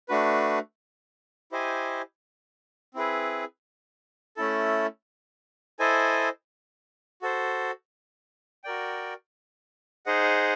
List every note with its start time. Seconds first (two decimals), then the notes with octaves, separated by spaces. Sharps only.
0.09 A3 D4 F#4 B4
1.52 E4 G4 C5 D#5 G#5
2.94 C4 E4 G#4 B4
4.37 A3 C#4 E4 A4
5.79 E4 A4 C5 D#5 G#5
7.22 F#4 A4 C5
8.64 F#4 A#4 D5 G5
10.06 D#4 G#4 C5 D#5 F#5